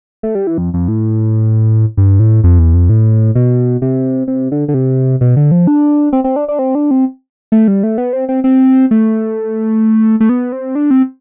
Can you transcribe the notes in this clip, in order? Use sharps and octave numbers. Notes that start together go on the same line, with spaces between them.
A3
G3
E3
F2
F2
A2
G2
A2
F2
E2
F2
A2
B2
C3
C3
D3
D3
C3
B2
D3
F3
D4
C4
C4
D4
D4
C4
D4
C4
A3
G3
A3
B3
C4
C4
C4
A3
A3
B3
C4
D4
C4